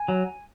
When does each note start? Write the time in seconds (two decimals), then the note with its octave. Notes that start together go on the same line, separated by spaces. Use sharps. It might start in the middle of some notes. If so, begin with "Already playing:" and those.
Already playing: G#5
0.08 F#3